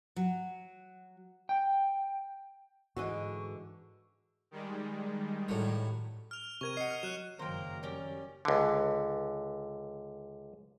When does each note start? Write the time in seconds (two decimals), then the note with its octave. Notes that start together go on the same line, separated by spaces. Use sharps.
0.16 F#3
1.49 G5
2.97 G#2 D3 E3 F#4 D#5 C#6
4.51 D#3 G3 G#3
5.49 A2 F#3
6.31 F6 F7
6.61 C3 A#4 C#6 G#6 D#7
6.77 D#5 F#5 C7 C#7
6.91 F6
7.03 F#3 F#6 E7
7.39 F#1 D#3 F#3 A#3 A#4 C5 G5 A#5
7.83 G3 C#4 G4 A#4
8.45 C#2 D3